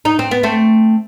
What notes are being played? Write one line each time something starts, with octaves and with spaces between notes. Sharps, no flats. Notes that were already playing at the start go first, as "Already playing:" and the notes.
D#4
C4
B3
A3 C4